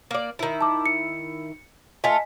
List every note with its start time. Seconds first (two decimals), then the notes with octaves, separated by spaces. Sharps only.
0.11 A#3 D5
0.39 D#3 E4
0.61 A5 D6
0.86 C#7
2.04 A3 F4 D#5 G#5 B6